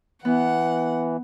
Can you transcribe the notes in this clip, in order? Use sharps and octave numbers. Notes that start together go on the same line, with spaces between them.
E3 B3 F#5